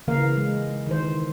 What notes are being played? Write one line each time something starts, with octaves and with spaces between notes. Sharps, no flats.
C#3 E3 A#3 A#4 F5
G#3
D#3 E3 C5